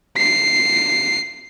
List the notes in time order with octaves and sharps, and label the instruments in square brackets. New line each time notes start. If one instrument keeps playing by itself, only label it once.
[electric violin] C7